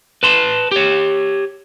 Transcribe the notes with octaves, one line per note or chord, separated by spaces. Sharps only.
B4 A5 C6
G4 C#5